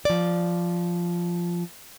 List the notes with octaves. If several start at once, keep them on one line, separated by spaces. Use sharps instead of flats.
F3 D5